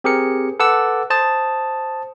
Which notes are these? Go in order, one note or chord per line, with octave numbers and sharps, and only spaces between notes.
C4 G4 G#4 A#4 C#7
A4 B4 F#5 D6 E6
C5 A5 D#6